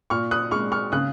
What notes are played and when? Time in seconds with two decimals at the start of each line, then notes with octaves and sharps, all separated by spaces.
0.10 A#2 C#6 F6
0.31 D#6 F#6
0.51 G#3 C#6 F6
0.72 C#6 F6
0.92 C#3 D#6 F#6